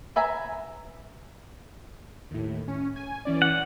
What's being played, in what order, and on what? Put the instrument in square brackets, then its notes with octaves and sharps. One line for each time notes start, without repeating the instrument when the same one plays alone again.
[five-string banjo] B4 E5 G#5 A#5
[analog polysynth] D#2 A2
C#4
G#5
E3 C#4 D5
[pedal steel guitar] F#5